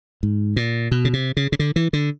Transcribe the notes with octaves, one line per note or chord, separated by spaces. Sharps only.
G#2
A#2
B2
C#3
C3
C#3
C#3
D3
E3
D3